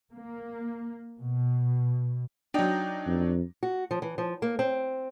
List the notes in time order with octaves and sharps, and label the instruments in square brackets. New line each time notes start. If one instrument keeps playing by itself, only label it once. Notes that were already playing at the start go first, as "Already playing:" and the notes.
[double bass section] A#3
B2
[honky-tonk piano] F#3 D4 [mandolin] D#4 G5
[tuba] F2
[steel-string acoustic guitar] F#4
F3
E3
F3
A#3
C4